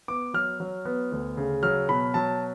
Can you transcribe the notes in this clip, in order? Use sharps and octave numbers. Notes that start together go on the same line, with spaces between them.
B3 D6
F#3 F6
F#3
B3
D2
C#3
F#3 F6
B2 B5
F#3 A5